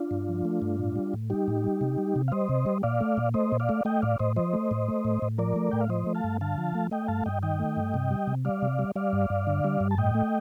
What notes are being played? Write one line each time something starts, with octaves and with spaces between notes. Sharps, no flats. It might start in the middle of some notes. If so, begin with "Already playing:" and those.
Already playing: D4 F4
G2
F3
A3
G2
A2
G3
A2
G3 D#4 G4
A2
G3
C3
G3
C3
F5
G3 C5 D#5
C3
G3
A#2 D5 F5
A3
A#2
A3 C5 D#5
A#2
D5 F5
A3
A3 D#5 G5
A2 D5 F5
A2 C5 D#5
F3 C5 D#5
A3
A2
A3
A2
A2
F3 A#4 D5
A3
A2 G5
F5
F3 C5 D#5
A3
F5 A5
G2
D3 F5 A5
F3
A3
A3 D#5 G5
G2 F5 A5
G2 D#5 G5
D#3 D#5 G5
A3
G2
C3
G3
C3
G3 D5 F5
C3
G3
G3 D5 F5
G2
G2
D3
G3
G2
A5
A2 D#5 G5
A3